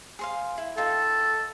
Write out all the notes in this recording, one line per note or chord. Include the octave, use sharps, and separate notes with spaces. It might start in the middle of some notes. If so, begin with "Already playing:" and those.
G#4 C5 F5
E4
D#4 F4 A4 G5